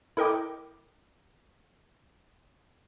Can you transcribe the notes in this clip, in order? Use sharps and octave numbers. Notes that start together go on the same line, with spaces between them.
E4 A4 A#4 D#5 G5 D6